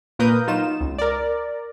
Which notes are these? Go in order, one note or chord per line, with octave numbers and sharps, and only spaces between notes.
A#2 A#3 A#4 B4 D#6 G6
F#3 D#4 F4 E7
C#2
A#4 D5